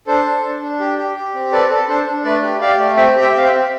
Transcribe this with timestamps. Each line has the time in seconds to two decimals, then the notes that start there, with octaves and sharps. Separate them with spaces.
0.07 D4 A4 C5
0.25 D4
0.43 D4
0.62 D4
0.80 G4
0.98 G4
1.16 G4
1.34 C4
1.52 A4 B4 D5
1.70 A4
1.88 D4 A4 C5
2.06 D4
2.25 A3 B4 D5
2.43 G4
2.61 G4 D5 F5
2.78 A3
2.96 C4 E5 G5
3.16 G4
3.21 E5 G5
3.33 C4 F5
3.45 E5 G5
3.51 C4